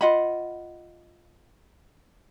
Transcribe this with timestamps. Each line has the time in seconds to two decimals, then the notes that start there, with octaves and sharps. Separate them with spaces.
0.01 F4 D#5 F#5 B5